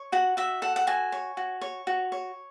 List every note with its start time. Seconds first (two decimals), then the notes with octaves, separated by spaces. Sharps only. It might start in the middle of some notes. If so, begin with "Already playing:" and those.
Already playing: C#5
0.12 F#4 F#5
0.37 F#4 E5
0.62 A4 F#5
0.76 F#5
0.87 F#4 G#5
1.12 C#5
1.37 F#4
1.61 C#5
1.87 F#4
2.12 C#5